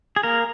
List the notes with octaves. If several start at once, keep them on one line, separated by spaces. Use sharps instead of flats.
G#4
A#3 A#4